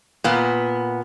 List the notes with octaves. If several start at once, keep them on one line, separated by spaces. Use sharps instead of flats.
A#2 B3